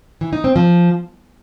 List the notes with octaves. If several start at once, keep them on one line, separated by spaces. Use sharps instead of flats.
E3
D#4
C4
F3